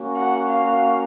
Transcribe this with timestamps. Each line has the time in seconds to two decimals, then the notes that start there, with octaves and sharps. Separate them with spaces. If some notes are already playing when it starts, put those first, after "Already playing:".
Already playing: A#3 C#4 F#4
0.17 F#5
0.50 F5